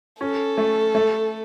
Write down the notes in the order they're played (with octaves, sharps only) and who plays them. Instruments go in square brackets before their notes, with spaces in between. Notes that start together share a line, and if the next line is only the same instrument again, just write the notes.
[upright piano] C#4 [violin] A4
[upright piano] A3
A3